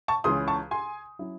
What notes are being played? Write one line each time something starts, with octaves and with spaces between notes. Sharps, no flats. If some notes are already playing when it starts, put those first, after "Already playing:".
A5 C#6
C#2 C#3 E3 G#3 C#4 C6 D#6
A5 C#6
G#5 C6
F#3 C#4 E4